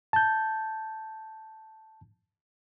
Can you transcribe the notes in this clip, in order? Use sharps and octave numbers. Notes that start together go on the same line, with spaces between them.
A5 G6